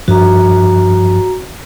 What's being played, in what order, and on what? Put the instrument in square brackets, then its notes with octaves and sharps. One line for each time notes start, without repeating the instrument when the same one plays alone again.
[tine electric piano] G2 F3 [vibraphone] F#4 A#5